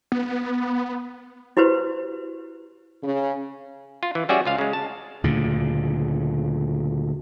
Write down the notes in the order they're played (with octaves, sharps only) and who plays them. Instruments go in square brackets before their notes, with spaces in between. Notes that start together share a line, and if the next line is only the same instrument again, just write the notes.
[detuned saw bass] B3
[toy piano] E4 F#4 G4 B4 C5
[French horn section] C#3
[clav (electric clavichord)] F4
E3
G3 C#4 F#4 G#4 D5 E5
C#2 F4 F5
C#3 G#3
A5
[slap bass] D2 A#2 C#3